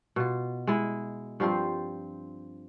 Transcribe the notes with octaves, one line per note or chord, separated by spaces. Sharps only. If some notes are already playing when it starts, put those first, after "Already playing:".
B2 F4
G#3 E4
G2 F3 C4 F4